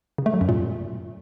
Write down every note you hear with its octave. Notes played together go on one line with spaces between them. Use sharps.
C#3
A3
F#3
F#2
A#2